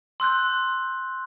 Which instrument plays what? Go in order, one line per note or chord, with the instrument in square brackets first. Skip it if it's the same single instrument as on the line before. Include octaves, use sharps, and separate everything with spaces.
[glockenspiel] C6 E6 F#6 G6